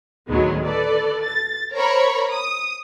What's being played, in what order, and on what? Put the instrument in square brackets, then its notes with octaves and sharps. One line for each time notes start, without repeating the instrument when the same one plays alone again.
[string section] D2 A2 D#3 F#3 G#3 B3
A4 B4 D5
A6
A#4 C5 C#5 A#5 B5 C#6
D#6